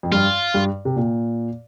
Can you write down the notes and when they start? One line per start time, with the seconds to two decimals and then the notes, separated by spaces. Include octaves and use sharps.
0.03 F2
0.12 G2 F4
0.54 G2
0.85 C3
0.96 A#2